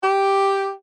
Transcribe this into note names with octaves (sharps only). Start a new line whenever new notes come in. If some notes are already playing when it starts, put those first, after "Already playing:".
G4